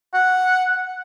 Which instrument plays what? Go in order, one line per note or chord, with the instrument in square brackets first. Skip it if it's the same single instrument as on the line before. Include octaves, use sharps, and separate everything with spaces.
[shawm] F#5